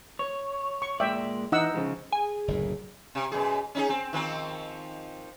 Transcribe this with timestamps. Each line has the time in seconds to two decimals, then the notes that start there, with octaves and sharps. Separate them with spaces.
0.19 C#5
0.82 C#6
1.00 A#2 G#3 D5 E5 G5
1.52 E3 D#4 F#5 E6
1.74 C#3 F3 G#3
2.13 G#4 G#5
2.48 F#1 D2 A2
3.15 C3
3.32 F#2 B2 G#4
3.75 C#4 D#4 G#4
3.89 C4
4.13 D#3 F3 C4